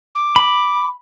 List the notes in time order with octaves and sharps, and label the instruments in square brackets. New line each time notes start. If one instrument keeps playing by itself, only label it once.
[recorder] D6
[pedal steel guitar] B5